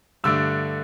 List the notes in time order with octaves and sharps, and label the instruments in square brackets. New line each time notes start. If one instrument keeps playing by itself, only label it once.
[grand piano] G2 D3 A3 D4 E6